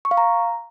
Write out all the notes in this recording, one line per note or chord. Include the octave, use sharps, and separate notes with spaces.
C#6
F5
A#5